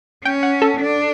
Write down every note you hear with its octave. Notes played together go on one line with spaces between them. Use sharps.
C#4 G5
F#5
A4
D4